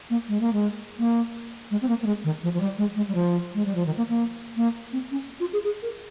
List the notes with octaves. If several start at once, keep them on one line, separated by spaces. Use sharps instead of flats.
A#3
G#3
A#3
G#3
A#3
G#3
C4
A#3
A#3
G#3
D#3
F3
F3
G3
G#3
G#3
G3
F3
G#3
G3
F3
D#3
A#3
A#3
A#3
C4
C#4
F4
G#4
G#4
A#4